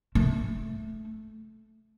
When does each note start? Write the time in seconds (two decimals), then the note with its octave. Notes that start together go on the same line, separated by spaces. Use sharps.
0.15 A3